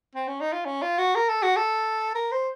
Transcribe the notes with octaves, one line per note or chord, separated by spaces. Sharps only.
C4
C#4
D#4
F4
C#4
F4
F#4
A#4
A4
F#4
A4
A#4
C5